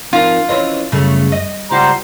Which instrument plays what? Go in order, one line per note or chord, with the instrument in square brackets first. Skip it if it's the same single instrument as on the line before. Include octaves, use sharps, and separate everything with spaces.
[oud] F3 [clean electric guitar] C4 D#4 A#4 [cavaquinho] F4
[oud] E3 C4 C#4 [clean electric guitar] D#5 C6
[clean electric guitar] F#2 [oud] C#3 G3 A3
[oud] D#5
[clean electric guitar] C#2 F4 F#5 [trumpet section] G3 C5 A#5